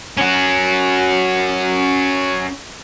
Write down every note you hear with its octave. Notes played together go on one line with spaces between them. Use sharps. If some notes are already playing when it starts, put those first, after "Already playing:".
C#4 F#4